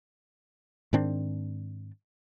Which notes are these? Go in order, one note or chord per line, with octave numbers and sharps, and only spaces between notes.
G#2 D#3 C4 D4